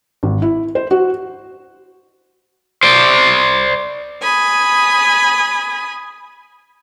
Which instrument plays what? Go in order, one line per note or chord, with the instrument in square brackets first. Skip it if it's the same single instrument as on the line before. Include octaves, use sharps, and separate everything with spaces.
[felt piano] G#1
E4
C5
F#4
[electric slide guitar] C5 D5
[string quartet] G#5 B5 D#6